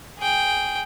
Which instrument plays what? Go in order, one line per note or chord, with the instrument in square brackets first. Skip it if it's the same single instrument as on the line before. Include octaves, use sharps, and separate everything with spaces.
[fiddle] G#4 G5